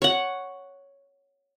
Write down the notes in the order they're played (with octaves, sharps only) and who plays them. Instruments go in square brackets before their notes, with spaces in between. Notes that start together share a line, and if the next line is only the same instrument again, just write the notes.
[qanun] C#5 F#5